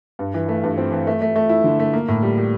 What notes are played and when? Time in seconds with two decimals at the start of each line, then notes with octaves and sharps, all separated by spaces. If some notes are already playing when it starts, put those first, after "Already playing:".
0.19 G2
0.34 E3
0.49 A3
0.64 G2
0.78 C4
0.92 E3
1.07 A3
1.21 A3
1.36 A3
1.49 E4
1.64 D3
1.80 A3
1.93 A#3
2.08 A2
2.22 G3
2.38 G3